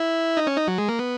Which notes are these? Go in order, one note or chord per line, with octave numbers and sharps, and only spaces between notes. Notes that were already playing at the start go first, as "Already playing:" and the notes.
Already playing: E4
D#4
C#4
D#4
F#3
G#3
A#3
B3